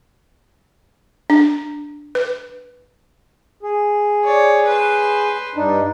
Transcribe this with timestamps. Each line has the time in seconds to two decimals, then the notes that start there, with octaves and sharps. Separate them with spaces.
1.30 D4
2.15 B4
3.63 G#4
4.24 C#5 D5
4.66 B4 C5
5.55 G2 D4 D#4